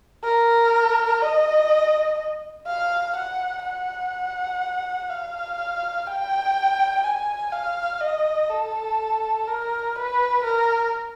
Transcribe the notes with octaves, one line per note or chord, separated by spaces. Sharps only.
A#4
D#5
F5
F#5
F#5
F5
G5
G#5
F5
D#5
A4
A#4
B4
A#4